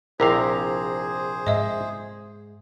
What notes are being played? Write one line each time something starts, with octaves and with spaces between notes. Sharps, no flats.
A#1 C3 E4 G#4 A#4 C5 F5
G#2 D#5 E5